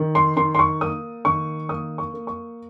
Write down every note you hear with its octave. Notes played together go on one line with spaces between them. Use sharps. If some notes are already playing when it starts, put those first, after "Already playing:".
Already playing: D#3
C6
D#3 C6
C6
C#6
A#3 D#6
D#3 C#6
A#3 D#6
C#6
A#3
C#6